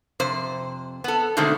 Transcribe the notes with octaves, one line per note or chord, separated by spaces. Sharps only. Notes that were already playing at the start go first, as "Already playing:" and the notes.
F2 C3 C5
B3 A4
B2 D3 D#3 G#3 A3 C4